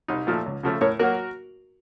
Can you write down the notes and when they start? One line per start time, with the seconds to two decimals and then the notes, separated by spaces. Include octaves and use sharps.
0.08 C2 D#4
0.27 A#2 F3 A3
0.46 C#2
0.63 C#3 F3 A3
0.81 A2 A#4 C#5
0.99 F#3 A#3 F#4 A#4